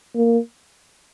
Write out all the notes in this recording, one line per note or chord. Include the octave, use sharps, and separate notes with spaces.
A#3